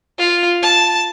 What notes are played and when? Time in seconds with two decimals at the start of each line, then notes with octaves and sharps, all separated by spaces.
0.19 F4
0.62 A5